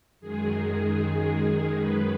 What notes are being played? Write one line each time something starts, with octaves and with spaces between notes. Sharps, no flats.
F#2 D#3 G#3 G#4
F#2 D#3 G#3 B4